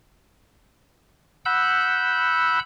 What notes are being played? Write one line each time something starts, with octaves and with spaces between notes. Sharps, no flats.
F#5 B5 E6 G6